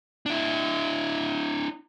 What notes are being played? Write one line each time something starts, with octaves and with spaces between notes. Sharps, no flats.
D4 E4